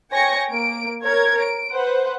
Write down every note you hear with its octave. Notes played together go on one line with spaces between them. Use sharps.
C#5 G5 G#5 C#6 A#6 C#7
A#3 D7
A#4 C#5 G#6
D7
B4 C5 F#5